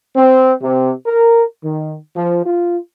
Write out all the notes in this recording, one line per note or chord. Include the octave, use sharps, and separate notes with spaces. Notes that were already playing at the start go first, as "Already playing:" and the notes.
C4
C3
A#4
D#3
F3
F4